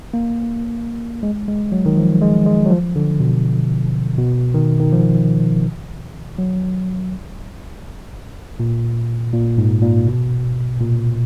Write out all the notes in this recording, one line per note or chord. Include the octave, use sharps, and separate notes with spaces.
A#3
G#3
G#3
F#3
D#3
F3
G#3
G#3
F#3
F3
D3
B2
B2
D#3
D#3
F3
F#3
A#2
A#2
G#2
A#2
B2
A#2